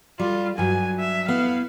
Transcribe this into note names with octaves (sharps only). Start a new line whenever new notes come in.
G3 F4
G2 F#3 G#5
E5
B3 E4 F5